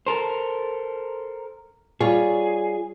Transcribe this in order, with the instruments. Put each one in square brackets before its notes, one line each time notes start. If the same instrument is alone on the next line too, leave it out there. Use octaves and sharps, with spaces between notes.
[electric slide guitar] A4 A#4 C5
[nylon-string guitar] G3 F4 C#5 [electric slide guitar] G#4